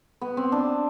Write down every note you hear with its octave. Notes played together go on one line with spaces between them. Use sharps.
B3
C4
D4